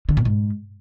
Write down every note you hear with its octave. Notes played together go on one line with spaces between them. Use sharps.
D3
A#2
G#2